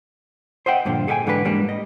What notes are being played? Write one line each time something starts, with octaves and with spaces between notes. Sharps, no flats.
C5 D#5 E5 F#5 G5
G2 A#2 D3 F3
G#4 A4 D#5 E5 G5 G#5
G#2 D3 E3 D4 G#4 B4
G#2 G3 G#3 A#3 D4
D#5